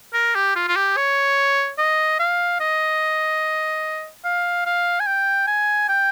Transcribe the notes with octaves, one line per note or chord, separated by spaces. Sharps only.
A#4
G4
F4
F4
G4
C#5
D#5
F5
D#5
F5
F5
G#5
G5
G#5
G5